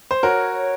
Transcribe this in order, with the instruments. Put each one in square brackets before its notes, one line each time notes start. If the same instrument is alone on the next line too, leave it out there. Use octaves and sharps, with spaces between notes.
[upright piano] C5
[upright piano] F#4 A#4 [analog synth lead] C#5